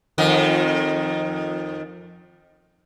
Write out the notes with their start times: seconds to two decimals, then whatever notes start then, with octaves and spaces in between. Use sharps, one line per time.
0.18 F2 D#3